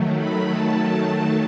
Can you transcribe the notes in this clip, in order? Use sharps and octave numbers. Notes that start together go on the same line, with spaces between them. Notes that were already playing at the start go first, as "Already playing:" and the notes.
Already playing: D#3 F#3 A3
B5
A5
A5
A5